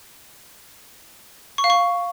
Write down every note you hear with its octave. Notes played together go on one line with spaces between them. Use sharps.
C#6
F5
C#6